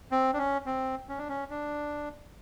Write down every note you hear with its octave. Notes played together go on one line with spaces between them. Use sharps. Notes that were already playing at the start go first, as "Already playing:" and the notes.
C4
D4
C#4
C4
C#4
D4
C#4
D4